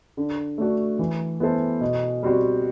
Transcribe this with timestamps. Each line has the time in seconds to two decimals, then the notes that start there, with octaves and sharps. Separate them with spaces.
0.17 D3
0.58 A3 D4 F#4
0.99 E3
1.40 B3 E4 A4 C5
1.81 B2
2.23 G3 C4 F#4